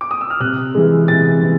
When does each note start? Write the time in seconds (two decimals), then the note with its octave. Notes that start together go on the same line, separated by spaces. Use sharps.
0.01 D6
0.11 D#6
0.21 E6
0.30 F6
0.40 C3 F#6
0.75 E3 G#3
1.08 C3 A6
1.42 E3